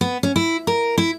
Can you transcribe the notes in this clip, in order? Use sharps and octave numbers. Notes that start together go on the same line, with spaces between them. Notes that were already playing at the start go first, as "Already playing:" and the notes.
B3
C#4
E4
A#4
E4